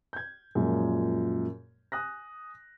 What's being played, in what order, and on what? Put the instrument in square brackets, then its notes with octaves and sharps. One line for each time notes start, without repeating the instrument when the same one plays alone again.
[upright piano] G6 G#6
F#2 A#2 F3 G#3
G#5 D#6 F#6 A#6